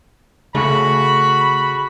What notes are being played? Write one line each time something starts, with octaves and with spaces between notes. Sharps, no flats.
C#3 A3 F#4 G#4 B5